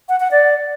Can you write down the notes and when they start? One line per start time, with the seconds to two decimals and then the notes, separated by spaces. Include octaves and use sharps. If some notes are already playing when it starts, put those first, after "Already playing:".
0.09 F#5
0.20 F#5
0.31 D5